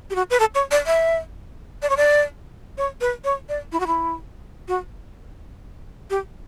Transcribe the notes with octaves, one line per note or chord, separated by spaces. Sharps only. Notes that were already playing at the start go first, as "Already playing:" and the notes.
G4
F#4
B4
A4
C#5
D5
E5
D5
C#5
D5
C#5
B4
C#5
D5
E4
F#4
E4
F#4
G4